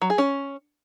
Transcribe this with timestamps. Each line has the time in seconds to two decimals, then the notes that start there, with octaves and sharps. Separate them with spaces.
0.02 F#3
0.10 G#4
0.18 C#4